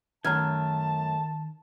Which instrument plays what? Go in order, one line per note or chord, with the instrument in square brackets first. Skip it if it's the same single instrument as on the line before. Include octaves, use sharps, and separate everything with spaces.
[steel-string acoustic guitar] F#2 A3 [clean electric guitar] D#3 [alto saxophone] A5 [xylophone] A#5 F6 G#6